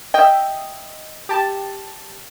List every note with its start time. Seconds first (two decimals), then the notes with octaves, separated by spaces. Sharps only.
0.14 D#5 E5 G5
1.29 G4 A5